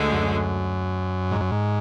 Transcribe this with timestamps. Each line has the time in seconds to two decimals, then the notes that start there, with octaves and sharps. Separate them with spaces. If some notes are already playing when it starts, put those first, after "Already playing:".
Already playing: D2 D3 G#3
0.12 F#2
1.31 G#2
1.41 F#2
1.51 G#2